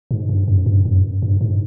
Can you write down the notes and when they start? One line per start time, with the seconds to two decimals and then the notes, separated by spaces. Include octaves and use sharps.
0.11 G#2
0.29 G2
0.48 F#2
0.66 G2
0.85 F#2
1.22 G2
1.41 G#2